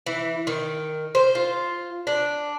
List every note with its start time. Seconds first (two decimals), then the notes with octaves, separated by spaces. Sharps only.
0.06 E3
0.47 D#3
1.15 C5
1.35 F4
2.07 D4